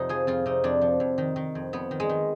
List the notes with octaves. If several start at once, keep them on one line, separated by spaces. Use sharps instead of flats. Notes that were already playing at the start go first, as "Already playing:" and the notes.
Already playing: F2 C3 D#4
F3 G#4
F2 F4
C3 D#4
F2 D4
F3
F2
D#3
D#3
F2
F2 B3
D#3
G#3
D#3